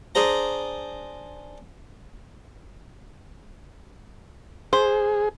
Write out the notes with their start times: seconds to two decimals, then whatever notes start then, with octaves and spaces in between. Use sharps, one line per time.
0.15 D4 G#4 C5 A#5
4.73 G#4 C5